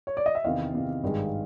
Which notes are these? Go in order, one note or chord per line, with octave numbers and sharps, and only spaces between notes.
C#5
D5
D#5
E5
E2 C3 D#3 D#5 F5
E2 C3 D#3
G#1 G2 D#3 G#3